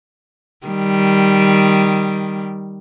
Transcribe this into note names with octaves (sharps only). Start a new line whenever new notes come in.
D#3 G3